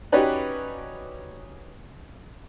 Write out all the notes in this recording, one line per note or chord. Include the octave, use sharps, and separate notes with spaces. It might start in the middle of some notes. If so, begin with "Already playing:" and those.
C#4 D#4 F#4 G4 B4 D5